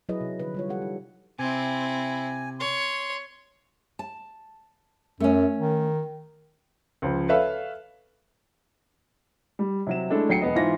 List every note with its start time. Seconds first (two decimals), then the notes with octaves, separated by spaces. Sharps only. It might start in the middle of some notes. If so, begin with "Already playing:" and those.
0.09 F#3 E4 G#4 B4 D#5
0.21 C3
0.40 D3 F3 B4
0.54 G3 F4 C#5
0.69 G3 G4 A4 F#5
0.82 D#4
1.39 C3 C4 E4 G#5
2.60 C#5 C6
3.99 A5
5.20 F#2 A3 C#4
5.58 D#3
7.02 C#2 F3
7.29 A4 B4 C#5 E5 F5
9.59 G3
9.87 C3 F#3 E7
10.10 G#3 A3 D4 E4 A4
10.29 D2 F#3 G5 C7 C#7
10.42 E1 B3 D#5
10.55 G#2 E3 F4 C5 A#6